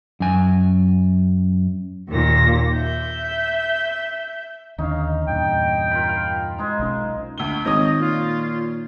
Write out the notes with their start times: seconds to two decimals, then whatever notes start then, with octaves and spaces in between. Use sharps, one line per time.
0.20 F#2 G#5
2.08 D#2 A#2 A#6
2.76 E5 G6
4.78 D#2 D3 C#4 D#4 F5
5.28 E2 G2 A#2 G5
5.91 F4 A#4 B5
6.09 F5
6.58 G#3 D#4 G#4 C5
6.80 B1 C#4
7.38 D2 G7
7.65 G#1 D#3 C#5 D#5 D#6
8.00 A#2 F4